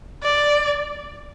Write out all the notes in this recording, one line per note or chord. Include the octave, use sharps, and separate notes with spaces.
D5